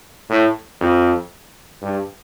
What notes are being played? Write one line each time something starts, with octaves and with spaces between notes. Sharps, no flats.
A2
F2
G2